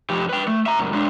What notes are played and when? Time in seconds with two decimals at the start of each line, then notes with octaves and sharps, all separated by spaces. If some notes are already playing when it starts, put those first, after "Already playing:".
0.10 F2 G4
0.29 B4 G5
0.48 A3
0.66 E5 A#5
0.79 C#2 F#2
0.93 G#3 D4